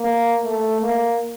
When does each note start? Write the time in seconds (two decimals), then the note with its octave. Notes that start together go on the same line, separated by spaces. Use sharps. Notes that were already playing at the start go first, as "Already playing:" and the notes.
Already playing: A#3
0.44 A3
0.82 A#3